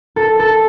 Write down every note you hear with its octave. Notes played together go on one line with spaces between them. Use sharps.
A4
A4